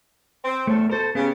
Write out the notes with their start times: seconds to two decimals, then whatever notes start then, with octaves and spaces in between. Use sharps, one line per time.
0.44 C4
0.67 E2 A2 A3 A4
0.90 B2 A4 A#4 C5
1.15 C#3 B3 C#4 G4